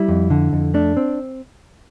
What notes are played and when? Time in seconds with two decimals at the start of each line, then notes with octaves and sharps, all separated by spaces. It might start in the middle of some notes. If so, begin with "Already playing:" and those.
Already playing: G3 E4
0.08 F2
0.30 D3
0.53 F2
0.74 A3 D4
0.97 C4